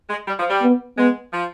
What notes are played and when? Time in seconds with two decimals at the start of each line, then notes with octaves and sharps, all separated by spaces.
0.10 G#3
0.28 G3
0.39 F3
0.50 G3
0.62 B3
0.98 G#3 B3
1.32 F3